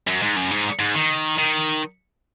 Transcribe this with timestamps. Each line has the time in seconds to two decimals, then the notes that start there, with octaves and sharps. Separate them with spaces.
0.07 F#2
0.22 G#2
0.36 F#2
0.51 G#2
0.79 G#2
0.95 D#3
1.38 D#3